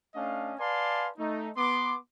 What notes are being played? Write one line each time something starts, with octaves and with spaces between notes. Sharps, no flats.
A3 C#4 D4 D#5 F5
B4 D5 F5 G#5 A5 C6
A3 D#4
B3 C6 D6